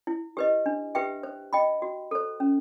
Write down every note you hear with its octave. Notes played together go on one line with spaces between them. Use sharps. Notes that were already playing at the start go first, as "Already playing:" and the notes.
E4
G4 B4 D#5
D4
G4 B4 E5 G5
C5
D#5 G5 B5
F#4
A4 C5
C#4